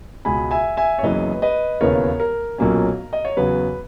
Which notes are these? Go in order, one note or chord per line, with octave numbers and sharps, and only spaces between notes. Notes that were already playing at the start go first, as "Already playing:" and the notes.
C#2 B2 G#3 G#5 B5
E5 G#5
E5 G#5
C#5
F#1 F#2 E3 B3 B4 D#5
B4 D#5
E1 D#2 C#3 E3 B3 A#4 C#5
A#4
B1 A#2 F#3 A#3 C#4
D#5
C#5
E2 C#3 F#3 B3 B4